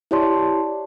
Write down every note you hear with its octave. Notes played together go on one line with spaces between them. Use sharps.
E4 G4 C#5 D5 A5 C6